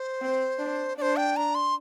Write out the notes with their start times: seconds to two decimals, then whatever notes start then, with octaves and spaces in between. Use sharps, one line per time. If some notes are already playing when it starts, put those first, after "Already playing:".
Already playing: C5
0.21 C4
0.59 D4
0.98 D4 C5 D5
1.17 G5
1.36 A#5
1.55 C6